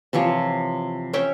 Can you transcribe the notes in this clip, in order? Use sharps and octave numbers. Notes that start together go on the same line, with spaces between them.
C3 E3 F3 C#5
C#4 C#5 E5 G5